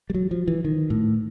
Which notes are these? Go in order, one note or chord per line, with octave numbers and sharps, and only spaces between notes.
G3
F#3
F3
E3
D#3
A2